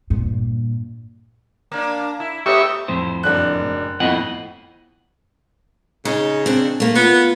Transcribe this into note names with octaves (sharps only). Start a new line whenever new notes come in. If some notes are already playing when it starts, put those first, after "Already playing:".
G2 A#2
A#3 D4
E4
A3 B3 G4 C#5 E5 C#6
F2 A2 C5
F#1 D4 F#6
F2 A2 B3 D#5 F#5
C#3 D#4
C4 D4
A3 A#3
B3 F4